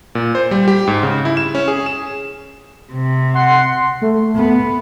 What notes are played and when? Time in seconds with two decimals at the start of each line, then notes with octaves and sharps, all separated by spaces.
0.15 A#2
0.35 C5
0.51 G3
0.68 G4
0.87 G#2
1.03 C#3
1.25 E4
1.37 E7
1.55 C#4
1.68 G#4
1.86 E7
2.93 C3
3.35 F#5 C6
4.02 A3
4.35 B3